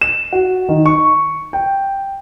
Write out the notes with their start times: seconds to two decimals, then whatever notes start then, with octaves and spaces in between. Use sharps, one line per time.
0.01 E7
0.33 F#4
0.69 D#3
0.86 C#6
1.53 G5